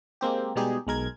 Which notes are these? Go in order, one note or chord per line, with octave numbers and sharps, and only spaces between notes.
G#3 A#3 C4 G4
B2 G3 G#3 D#4 G4 G#4
B1 G#3 A#4 G#6